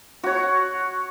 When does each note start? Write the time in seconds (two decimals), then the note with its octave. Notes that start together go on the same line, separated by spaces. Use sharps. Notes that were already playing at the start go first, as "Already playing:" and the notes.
0.24 F#4 C#5